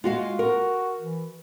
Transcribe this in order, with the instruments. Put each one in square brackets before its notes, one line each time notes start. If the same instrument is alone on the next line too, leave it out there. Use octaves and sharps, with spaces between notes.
[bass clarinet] G#3 [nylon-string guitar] F4 F#4 F5
[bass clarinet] F#4 [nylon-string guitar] A#4
[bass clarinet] E3